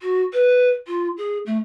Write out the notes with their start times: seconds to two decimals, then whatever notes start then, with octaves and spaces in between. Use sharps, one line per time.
0.01 F#4
0.33 B4
0.87 F4
1.17 G#4
1.46 A3